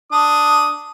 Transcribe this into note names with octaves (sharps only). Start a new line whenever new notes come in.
D4 D#6